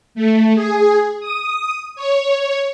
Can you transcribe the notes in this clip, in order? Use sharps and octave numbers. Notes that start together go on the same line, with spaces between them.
A3
G#4
D#6
C#5